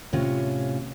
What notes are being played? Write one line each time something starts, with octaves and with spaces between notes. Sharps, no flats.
A2 C3 C#4 F4